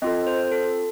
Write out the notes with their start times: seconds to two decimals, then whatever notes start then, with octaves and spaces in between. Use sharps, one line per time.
0.02 C4 F4 A4 D#5
0.27 C5
0.52 A4